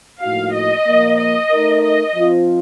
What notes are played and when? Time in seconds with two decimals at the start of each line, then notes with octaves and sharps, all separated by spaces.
0.22 A2 F3 A#3 D#4 F#4 F5
0.54 D#5
0.86 A#2 F3 A#3
1.18 D#5
1.51 A3 D#4 A#4
1.83 D#5
2.15 F3 C4 F4